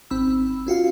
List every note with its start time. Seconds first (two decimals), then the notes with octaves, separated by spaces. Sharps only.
0.11 G#1 C4 B5 E6
0.67 C#4 F4 F#4 F5